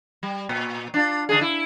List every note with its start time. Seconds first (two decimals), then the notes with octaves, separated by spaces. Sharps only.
0.23 G3
0.49 A#2
0.94 D4 F4
1.29 D3 D4 G#4
1.41 E4